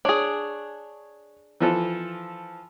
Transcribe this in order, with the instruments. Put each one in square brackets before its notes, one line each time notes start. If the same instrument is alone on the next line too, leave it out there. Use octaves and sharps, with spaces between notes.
[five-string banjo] D4 G#4 [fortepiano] C#5
[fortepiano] E3 F3 A4